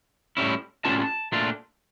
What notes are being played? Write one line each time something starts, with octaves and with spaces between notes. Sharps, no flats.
A2 G3 C#4 E4
A2 G3 C#4 F4 A5
A#2 A3 D4 F4